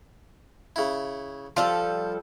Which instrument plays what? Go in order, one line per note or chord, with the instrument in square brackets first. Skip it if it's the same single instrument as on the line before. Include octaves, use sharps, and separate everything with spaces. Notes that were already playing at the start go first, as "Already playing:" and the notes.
[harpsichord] C#3 E4
[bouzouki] F3 G3 A4 [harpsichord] F4